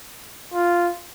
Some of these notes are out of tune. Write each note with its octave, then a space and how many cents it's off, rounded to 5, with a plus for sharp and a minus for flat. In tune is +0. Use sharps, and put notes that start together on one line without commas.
F4 -5